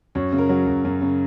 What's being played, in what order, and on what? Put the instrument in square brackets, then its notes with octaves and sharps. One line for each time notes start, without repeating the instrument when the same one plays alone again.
[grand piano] F#2 C#5
C#3
A#4
F#3
F#2
F#2
C#3